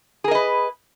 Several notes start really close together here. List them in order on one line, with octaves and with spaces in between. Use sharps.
G#4 A#4 D#5 B4